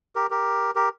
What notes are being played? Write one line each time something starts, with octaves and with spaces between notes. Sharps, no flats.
G4 A#4
G4 A#4
G4 A#4